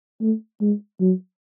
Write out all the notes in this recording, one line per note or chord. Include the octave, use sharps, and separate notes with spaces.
A3
G#3
F#3